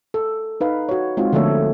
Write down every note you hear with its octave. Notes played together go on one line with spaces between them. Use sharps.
A4
D#4 B4 F5
F#4 C#5
G#3 C4 D#4 F4 F#4
D3 F3 A3 A#3 A4 C#5